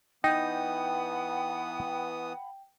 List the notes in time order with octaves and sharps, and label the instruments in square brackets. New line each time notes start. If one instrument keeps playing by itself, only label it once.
[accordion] E3 B3 D#6 [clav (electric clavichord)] D#4 [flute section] F#5 A5 B5 [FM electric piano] G5